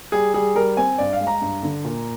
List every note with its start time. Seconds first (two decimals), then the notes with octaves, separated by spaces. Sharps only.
0.12 G3 G#4
0.34 G3 G#4
0.55 G3 A#4
0.77 C4 G#5
0.98 G2 D5
1.13 F5
1.20 G#3
1.27 A#5
1.41 G2
1.63 D3
1.84 A#2